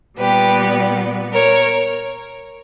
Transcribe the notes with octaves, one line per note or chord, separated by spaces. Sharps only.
A#2 G3 B3 G4 B4
A#4 C#5